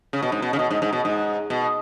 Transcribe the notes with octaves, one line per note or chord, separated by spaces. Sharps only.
C#3
B2
G#2
B2
C#3
B2
G#2
G#2
B2
G#2
B2